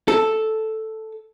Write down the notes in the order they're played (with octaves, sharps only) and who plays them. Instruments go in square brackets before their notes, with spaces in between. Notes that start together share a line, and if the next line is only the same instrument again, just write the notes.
[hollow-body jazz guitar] A4